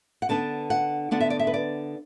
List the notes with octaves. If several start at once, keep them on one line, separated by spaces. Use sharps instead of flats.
F#5
D3 B3 D4 A5
F#5
D3 B3 D4 F#5
E5
D5
E5
B4
D5